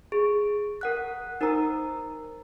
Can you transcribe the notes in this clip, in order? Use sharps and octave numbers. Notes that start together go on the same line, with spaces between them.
G#4
A#4 F#5 F#6
D#4 A#4 C5 A#5 E6